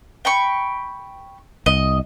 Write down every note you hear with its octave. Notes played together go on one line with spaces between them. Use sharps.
G5 B5 C#6
C2 D#5